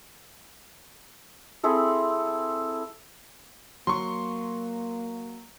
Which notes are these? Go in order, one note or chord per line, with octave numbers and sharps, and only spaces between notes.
C4 E4 G#4 A4
F#3 A#3 C6 C#6